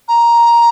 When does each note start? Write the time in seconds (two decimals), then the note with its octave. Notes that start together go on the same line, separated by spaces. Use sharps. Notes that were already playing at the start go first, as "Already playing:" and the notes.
0.08 A#5